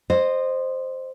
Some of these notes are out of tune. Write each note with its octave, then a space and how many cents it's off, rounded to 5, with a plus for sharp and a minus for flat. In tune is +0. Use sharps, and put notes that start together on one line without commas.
C5 +0 D#5 -20